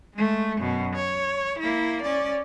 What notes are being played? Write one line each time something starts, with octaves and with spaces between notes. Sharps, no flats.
G#3 A3
F#2 B2
C#5
A#3 E4
C#4 D5